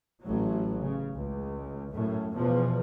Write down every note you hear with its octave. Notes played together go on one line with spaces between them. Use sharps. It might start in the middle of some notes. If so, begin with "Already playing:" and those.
A1 A2 F#3
C#3
C#2
F#2 A2
E2 B2 F3